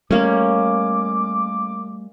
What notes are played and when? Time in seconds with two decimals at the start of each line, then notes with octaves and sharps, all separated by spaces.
0.11 G3 A3 A#3 C#4 D6